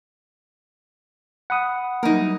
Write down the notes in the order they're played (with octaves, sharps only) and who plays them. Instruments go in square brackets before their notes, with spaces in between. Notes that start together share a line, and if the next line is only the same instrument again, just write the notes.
[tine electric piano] F#5 B5 D#6
[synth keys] F#3 G3 A#3 [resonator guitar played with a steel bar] D#4 E4 A#4